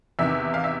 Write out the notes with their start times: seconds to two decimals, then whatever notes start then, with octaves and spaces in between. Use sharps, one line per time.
0.19 E2 C3 D#3 E5
0.54 F5
0.64 E5